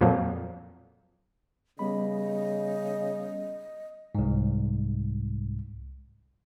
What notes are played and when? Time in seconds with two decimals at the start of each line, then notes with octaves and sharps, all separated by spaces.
0.01 F2 A#2 F3 F#3
1.79 C#3 G3 B3 D#5 B5
4.15 C2 G#2